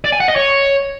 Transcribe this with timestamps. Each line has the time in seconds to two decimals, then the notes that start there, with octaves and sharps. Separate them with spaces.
0.05 D5
0.12 G#5
0.20 F#5
0.28 D#5
0.36 C#5